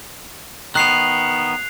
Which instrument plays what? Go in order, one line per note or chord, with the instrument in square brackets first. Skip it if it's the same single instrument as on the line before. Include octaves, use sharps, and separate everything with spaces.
[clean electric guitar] D#3 B3 [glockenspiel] F#6 C7 F7